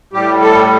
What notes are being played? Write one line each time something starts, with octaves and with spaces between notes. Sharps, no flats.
A2 G3 G4
A4